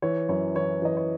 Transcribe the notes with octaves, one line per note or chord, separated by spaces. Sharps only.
E3 C#5
F#2 C#5
E3 C#5
E3 D#5
C#5